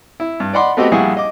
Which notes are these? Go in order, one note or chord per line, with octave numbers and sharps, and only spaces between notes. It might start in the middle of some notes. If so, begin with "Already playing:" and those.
E4
G2
D5 D#5 F#5 B5 C6 D6
A3 B3 C4 F#4 G4 D#5
A#1 G3 E4 G#4 F#5 C#6
D#5 D6